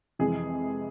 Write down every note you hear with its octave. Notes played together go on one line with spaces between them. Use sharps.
F2 C3 E3 G#3 G#4